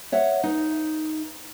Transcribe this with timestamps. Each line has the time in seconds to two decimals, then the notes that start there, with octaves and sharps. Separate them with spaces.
0.12 C#5 E5 F#5
0.43 D#4 B4